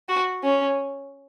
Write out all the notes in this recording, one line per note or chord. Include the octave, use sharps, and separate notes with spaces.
F#4
C#4